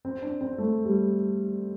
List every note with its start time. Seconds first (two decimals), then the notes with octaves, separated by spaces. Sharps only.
0.05 C4
0.22 D4
0.41 C4
0.58 A3
0.85 G3